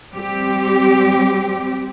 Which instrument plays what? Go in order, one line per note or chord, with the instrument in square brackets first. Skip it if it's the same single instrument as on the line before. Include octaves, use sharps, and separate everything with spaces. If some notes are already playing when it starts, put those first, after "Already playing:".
[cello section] G3 C4 G4